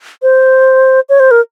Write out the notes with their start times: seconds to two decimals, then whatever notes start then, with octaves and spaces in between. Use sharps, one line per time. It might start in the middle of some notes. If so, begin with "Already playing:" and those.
0.22 C5
1.09 C#5
1.20 C5
1.31 A#4